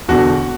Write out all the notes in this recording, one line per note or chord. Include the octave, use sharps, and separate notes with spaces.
E1 E2 D3 F#4